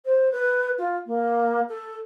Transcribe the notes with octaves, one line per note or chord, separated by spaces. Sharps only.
C5
B4
F4
A#3
A4